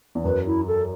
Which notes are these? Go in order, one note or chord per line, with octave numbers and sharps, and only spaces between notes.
E2
F#2 B4
E4
A4